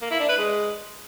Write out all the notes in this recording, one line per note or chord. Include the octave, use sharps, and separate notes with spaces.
A#3
E4
D4
B4
G#3